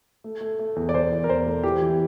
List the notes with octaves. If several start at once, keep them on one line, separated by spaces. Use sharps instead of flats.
A3
A3
A3
E2
D5
E2 C5
E2
A#4
E2 C5
A3
E3 G4
E3